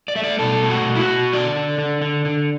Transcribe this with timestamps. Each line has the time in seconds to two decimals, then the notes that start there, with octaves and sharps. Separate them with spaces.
0.08 D5
0.15 A3 E5
0.24 D5
0.39 B2 A4
0.63 A3
0.70 F#4
0.85 B2
0.95 E4
1.01 F#4
1.09 B2
1.32 D3 D5
1.56 D3
1.78 D3
2.02 D3
2.25 D3